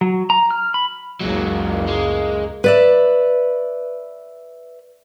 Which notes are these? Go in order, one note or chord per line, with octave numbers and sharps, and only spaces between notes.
F#3
A#5
F6
B5
F#1 C#2 F#3 G#3 A#3
G#3
B4 D5 E5